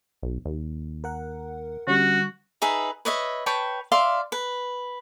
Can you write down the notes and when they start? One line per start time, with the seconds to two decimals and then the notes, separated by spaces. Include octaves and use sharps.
0.22 B1
0.45 D#2
1.04 A#4 F#5
1.87 D3 G3 C#4 F#4
2.62 D#4 G#4 B4 E5
3.05 B4 C#5 D#5 E5
3.46 B4 C#5 G5 A5
3.92 D5 E5 F5 C6
4.32 B4